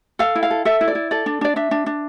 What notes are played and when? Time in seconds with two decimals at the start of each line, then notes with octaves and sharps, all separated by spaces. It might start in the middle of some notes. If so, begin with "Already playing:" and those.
0.19 A4 F5
0.35 E4
0.43 F5
0.50 A4
0.65 A4 E5
0.81 E4
0.88 D5
0.95 E4
1.11 A4 D5
1.26 D4
1.41 D4 D5
1.56 D4 E5
1.71 D4
1.86 D4